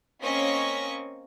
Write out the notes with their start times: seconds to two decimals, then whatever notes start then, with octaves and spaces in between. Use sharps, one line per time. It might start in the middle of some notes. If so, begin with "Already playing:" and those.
0.21 A#3 C4 C#4 D#5 C#6 B6